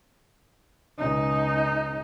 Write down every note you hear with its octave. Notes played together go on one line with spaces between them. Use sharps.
C#2 D#4